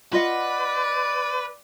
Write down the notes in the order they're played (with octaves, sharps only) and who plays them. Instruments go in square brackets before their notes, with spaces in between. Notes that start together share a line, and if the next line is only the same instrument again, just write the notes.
[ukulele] F4 D#5 F#5 [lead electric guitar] B4 [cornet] D5